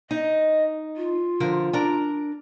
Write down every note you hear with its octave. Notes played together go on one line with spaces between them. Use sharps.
D#4 D#5
F4
D3 F3 A#4
D4 A#4 A#5